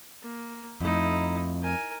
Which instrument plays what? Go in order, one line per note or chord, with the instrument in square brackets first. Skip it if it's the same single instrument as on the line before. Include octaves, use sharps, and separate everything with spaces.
[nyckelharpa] A#3
[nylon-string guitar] F2 A3 [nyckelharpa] D#4 E4
[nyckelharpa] A#4 G#5